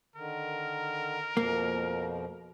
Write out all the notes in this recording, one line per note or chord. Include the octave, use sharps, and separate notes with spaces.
D3 D#3 A#4
F2 B2 F3 A#3